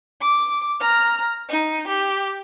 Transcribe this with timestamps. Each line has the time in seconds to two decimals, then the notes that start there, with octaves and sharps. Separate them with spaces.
0.22 D6
0.81 A#5 F6
1.49 D#4
1.88 G4